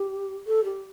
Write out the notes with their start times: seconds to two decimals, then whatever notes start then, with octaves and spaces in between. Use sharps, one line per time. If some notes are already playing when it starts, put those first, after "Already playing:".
Already playing: G4
0.47 A4
0.64 G4